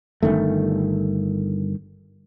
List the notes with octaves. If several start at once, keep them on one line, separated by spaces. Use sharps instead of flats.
G1 F2 D#3 A3